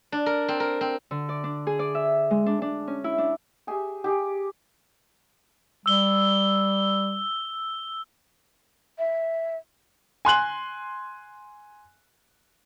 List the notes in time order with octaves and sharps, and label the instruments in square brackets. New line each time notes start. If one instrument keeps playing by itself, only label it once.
[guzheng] D4
A#4
C4
A#4
C4
[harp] D3
D5
D4
G#4
D5
E5
G#3
D4
D4
C#4
E4
D4
[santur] G4 G#4 E5
G4 G#4
[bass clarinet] G3 [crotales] E6 G7
[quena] E5
[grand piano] G#5 C6 F#6 F#7